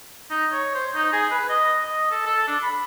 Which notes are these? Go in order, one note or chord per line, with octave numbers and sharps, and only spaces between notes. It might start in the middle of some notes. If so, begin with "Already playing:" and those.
D#4
C#5
C5
D#4
G#4
B4
D#5
D#5
A4
A4
D4
B5